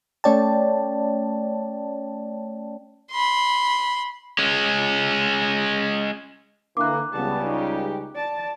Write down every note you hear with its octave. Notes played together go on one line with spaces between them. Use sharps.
A3 C#4 C#5 D5 G5 A5
B5 C6
G#3 C#4
D3 E3 A#3 D6 F#6
C#2 C#3 G3 B3 A5
D#4 G4
D5 A5